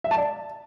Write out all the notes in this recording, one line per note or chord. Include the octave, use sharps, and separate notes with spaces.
E5
A5
D5